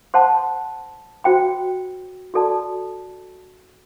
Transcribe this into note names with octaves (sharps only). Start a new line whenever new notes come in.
C5 F#5 A5 C6
F#4 C5 G5 B5
F#4 A4 D5 A5